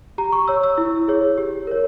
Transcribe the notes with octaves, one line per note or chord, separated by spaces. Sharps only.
G4 A#5
C#6
C#5 E6
E6
E4
G#4 C#5
G4
A#4 C#5